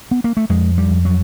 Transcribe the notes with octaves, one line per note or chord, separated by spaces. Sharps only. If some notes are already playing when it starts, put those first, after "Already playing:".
B3
A#3
A3
F2 G#3
G3
F2
F#3